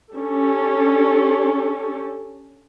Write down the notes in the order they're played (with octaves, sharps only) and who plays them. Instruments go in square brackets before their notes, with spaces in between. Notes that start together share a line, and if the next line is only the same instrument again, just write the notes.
[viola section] C#4 D4 G4 A4